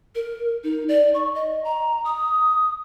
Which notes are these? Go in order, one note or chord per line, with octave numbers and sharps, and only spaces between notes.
A#4
D#4
D5
C#6
D#5
A#5
D#6